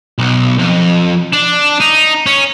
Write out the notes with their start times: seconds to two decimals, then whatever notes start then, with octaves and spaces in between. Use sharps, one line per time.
0.18 B1
0.59 F2
1.33 D4
1.80 D#4
2.27 C#4